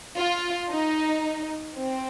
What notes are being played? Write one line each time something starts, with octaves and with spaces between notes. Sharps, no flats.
F4
D#4
C4